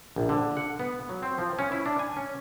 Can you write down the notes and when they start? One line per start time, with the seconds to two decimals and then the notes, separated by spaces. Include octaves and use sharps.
0.16 A#1
0.29 D3
0.57 F#5
0.79 B3
1.09 F#3
1.23 C4
1.38 F3
1.59 C#4
1.72 E4
1.86 D4
1.99 G#5
2.17 C#4